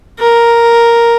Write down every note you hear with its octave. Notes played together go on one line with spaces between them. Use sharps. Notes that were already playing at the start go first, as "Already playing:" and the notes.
A#4